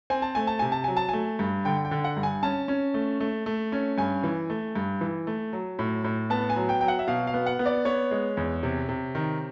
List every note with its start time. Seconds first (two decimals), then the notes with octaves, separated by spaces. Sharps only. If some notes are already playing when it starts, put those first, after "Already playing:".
0.10 C4 G#5
0.22 A5
0.35 A3 G#5
0.47 A5
0.59 C3 G#5
0.72 A5
0.84 F#3 G#5
0.97 A5
1.09 A3 G#5
1.39 G2
1.65 D3 G5
1.85 G5
1.91 D3
2.04 F#5
2.17 G2
2.23 G#5
2.43 C#4 A5
2.68 C#4
2.94 A3
3.20 A3
3.46 A3
3.72 C#4
3.98 G2 G#5
4.24 E3
4.50 A3
4.76 G2
5.01 E3
5.27 A3
5.53 F#3
5.79 A2
6.04 A2
6.30 B3 A5
6.50 G#5
6.56 F#3
6.69 G5
6.81 F#3 G5
6.88 F#5
6.99 E5
7.07 B2 F5
7.27 F5
7.34 B3
7.46 F#5
7.59 B3
7.66 D5
7.85 B3 C#5
8.11 G#3
8.37 E2
8.63 C3
8.89 C3
9.15 D#3